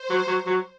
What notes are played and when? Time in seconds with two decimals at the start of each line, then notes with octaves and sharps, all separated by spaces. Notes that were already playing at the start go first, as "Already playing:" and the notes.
Already playing: C5
0.10 F#3
0.28 F#3
0.46 F#3